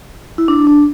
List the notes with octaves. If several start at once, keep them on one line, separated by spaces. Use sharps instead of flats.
E4
D4
D4